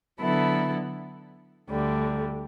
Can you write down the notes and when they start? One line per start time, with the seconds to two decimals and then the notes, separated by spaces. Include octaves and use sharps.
0.20 D3 F#3 B3 E4 A4
1.69 D2 D3 G3